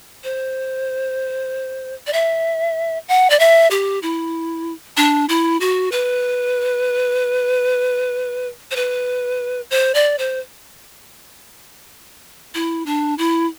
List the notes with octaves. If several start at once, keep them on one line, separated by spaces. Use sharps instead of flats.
C5
D5
E5
F#5
D5
E5
G4
E4
D4
E4
F#4
B4
C5
B4
C5
D5
C5
E4
D4
E4